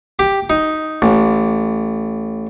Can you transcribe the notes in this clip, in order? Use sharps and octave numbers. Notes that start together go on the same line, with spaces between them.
G4
D#4
A1